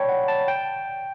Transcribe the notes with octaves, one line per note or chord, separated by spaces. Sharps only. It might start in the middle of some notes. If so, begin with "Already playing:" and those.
Already playing: C#5 D5 G5 A5 B5
F#5
A5
G5